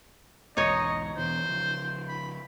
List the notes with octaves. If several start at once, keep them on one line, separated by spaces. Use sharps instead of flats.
B1 E2 G#2 D#4 C#5 D#5
E2 B2 E3 C5
C#3 F3
B5